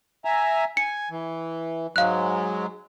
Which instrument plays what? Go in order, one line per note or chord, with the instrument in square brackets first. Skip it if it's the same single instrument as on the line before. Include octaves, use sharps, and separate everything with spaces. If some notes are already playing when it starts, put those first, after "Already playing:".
[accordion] E5 G#5 A#5
[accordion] G#5 [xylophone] C#7
[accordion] E3
[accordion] G#2 F#3 G#3 [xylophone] F5 F#6